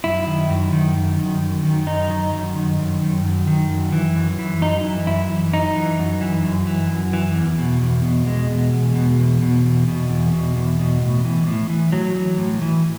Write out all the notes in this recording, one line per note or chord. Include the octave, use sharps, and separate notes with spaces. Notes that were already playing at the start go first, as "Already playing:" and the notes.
F#2 E4
D#3
F#2
D#3
F#2
D#3
F#2
D#3
F#2 D#4
D#3
F#2
D#3
F#2
D#3
F#2
D#3
F#2
E3
F#2
E3
F#2 D#4
E3
F#2 E4
E3
F#2 D#4
E3
F#2
E3
F#2
E3
F#2
E3
E2
B2
E2
B2
E2 G#3
B2
E2
B2
E2
B2
E2
B2
E2
B2
E2
B2
A2
E3
A2
E3
A2 F#3
E3
A2
E3